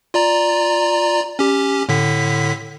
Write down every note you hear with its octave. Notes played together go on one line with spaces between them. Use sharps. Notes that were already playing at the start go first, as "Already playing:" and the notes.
F4 D5 A#5
C#4 G4
A2 D3 B6